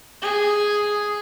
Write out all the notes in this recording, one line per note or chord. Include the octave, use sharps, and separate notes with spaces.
G#4